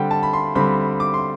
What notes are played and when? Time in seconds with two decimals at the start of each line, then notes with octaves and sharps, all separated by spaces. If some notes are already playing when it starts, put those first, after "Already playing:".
Already playing: D3 G3 C4 F#5 G5
0.11 A5
0.23 B5
0.33 C6
0.55 D3 G3 C4 B5
1.00 D6
1.14 C6